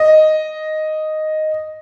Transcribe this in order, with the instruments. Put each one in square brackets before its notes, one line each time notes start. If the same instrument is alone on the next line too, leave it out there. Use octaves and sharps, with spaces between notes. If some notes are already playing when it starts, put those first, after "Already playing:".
Already playing: [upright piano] D#5